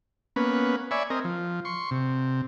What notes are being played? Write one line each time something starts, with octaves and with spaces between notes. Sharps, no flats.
A#3 B3 C#4 B4
C#5 D5 E5 G#5 B5
C4 A#4 D#5
F3
C6 C#6
C3